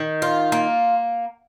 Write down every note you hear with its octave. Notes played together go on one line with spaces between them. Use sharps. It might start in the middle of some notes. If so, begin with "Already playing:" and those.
Already playing: D#3
F4
A#3